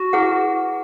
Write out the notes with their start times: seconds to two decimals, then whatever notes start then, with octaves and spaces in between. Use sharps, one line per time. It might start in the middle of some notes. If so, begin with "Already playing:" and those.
Already playing: F#4
0.13 E4 G#4 B4 F#5